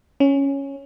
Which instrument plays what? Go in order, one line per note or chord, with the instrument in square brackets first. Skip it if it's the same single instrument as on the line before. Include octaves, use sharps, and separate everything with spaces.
[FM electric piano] C#4